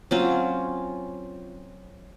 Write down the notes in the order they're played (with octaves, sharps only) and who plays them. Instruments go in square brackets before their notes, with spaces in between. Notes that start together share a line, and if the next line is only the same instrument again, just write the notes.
[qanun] F#3 C4 C#4 F4